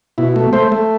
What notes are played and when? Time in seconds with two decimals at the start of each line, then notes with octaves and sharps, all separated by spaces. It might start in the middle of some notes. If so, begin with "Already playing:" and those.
0.18 B2 E4
0.36 A3
0.53 A3 C5
0.72 A3